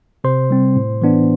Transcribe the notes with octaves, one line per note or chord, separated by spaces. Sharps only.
C3 C5 C6
G3 C4
A2
E3 B3 D4